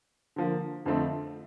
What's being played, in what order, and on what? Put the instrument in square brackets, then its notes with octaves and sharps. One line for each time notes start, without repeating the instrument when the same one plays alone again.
[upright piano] D3 F3 A#3
F2 D3 F3 A3 C4